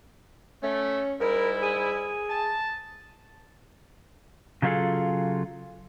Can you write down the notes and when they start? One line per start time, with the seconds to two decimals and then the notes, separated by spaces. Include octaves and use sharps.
0.63 A3 C#4
1.20 G#2 G3 E4 A#4
1.62 G#4
2.30 A5
4.62 C#3 F#3 A3 F4 G#4 A4